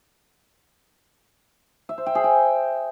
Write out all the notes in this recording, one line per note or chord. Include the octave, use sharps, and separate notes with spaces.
E5
C5
G5
G#4
G5